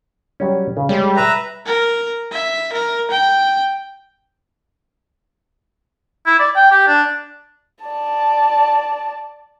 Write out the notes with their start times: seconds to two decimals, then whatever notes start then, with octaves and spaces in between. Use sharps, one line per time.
0.40 F#3 G3 C#4
0.77 C#3
0.89 G3 G#3 C#5
1.16 B4 E5 A#5
1.66 A#4
2.32 E5
2.73 A#4
3.11 G5
6.26 E4
6.39 D5
6.56 G5
6.71 G4
6.87 D4
7.84 D5 A5